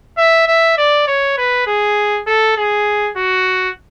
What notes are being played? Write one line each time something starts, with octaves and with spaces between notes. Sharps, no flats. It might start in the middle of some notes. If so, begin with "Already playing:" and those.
E5
E5
D5
C#5
B4
G#4
A4
G#4
F#4